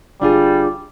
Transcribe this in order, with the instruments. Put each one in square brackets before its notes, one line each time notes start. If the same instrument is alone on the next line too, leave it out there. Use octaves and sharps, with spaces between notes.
[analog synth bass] G1 [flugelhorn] G3 [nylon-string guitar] D4 F4 G#4